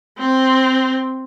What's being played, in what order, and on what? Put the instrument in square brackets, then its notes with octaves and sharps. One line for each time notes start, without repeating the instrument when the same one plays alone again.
[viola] C4